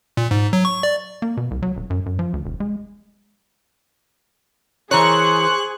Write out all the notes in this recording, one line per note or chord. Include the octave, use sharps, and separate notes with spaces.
A#2
G#2
F#3
C#6
D5
A#3
B2
C2
F#3
D#1
F#2
F#2
F3
D2
E1
G#3
E3 G#4 A#4 C5 C#5 C#6 F#6